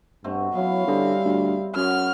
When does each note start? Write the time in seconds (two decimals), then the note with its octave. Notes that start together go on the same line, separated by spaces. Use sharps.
0.24 G2 B2 A3 C4
0.55 F#3 B3 C#4 E4 F5
0.88 D3 G3 C4 G#4
1.25 D2
1.75 F#2 F#4 G#4 C#5 F6